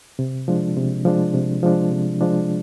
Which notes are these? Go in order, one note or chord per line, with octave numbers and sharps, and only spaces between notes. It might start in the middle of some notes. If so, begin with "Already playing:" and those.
C3
F3 G#3 D4
C3
F3 G#3 D4
C3
F3 G#3 D4
C3
F3 G#3 D4